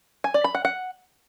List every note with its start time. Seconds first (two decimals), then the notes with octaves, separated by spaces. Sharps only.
0.24 G#5
0.34 D5
0.44 B5
0.55 F#5
0.65 F#5